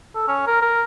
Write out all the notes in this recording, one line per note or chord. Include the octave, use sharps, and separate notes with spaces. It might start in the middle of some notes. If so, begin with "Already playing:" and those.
A4
C#4
A#4
A#4